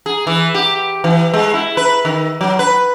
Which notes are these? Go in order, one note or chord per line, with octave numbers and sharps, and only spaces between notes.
G#4
E3
G4
E3
G#3
E4
B4
D#3
F#3
B4